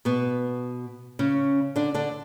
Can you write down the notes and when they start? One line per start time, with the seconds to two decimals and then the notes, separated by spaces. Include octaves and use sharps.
0.05 B2 B3
1.19 C#3 C#4
1.76 D3 D4
1.94 D3 D4